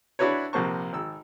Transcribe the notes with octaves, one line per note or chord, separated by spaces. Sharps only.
D4 E4 F#4 B4 C#5
A#1 C3 A#3 C5 A5 C#6
G#1 E6